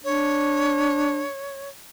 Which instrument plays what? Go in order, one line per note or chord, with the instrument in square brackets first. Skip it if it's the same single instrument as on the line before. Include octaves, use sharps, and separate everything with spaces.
[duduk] D4 [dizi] C#5